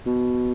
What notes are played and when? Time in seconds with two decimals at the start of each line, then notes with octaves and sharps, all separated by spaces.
0.06 B2